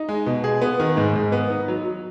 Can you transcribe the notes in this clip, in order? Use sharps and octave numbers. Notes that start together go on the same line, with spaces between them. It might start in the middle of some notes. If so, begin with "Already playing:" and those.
Already playing: D#4
G#3
B2
G#4
B3
D#3
G#2
G#2
B3
D#4
F#3
F#3